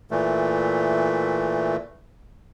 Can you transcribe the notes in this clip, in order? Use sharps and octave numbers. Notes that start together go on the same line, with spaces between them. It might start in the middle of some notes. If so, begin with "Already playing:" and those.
A#2 E3 A3